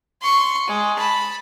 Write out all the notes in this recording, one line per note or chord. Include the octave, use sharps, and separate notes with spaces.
C6 C#6
G#3
A5 B5